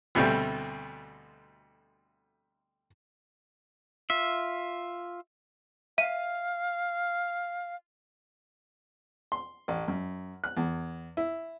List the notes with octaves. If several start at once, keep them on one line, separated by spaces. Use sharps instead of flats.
D2 B2 G3 A3 C4
F4 E5
E5 F5 D#7
C6
A1
F#2
F#6
E2
E4